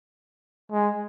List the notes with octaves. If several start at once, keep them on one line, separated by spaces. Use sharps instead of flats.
G#3